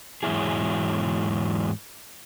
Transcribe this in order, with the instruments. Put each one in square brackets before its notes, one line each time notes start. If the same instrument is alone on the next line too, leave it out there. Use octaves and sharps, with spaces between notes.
[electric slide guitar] E2 G#2 F#3 E4 G#4